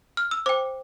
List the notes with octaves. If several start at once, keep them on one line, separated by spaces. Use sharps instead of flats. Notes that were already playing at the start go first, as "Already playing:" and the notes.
F6
E6
C5 G5 D6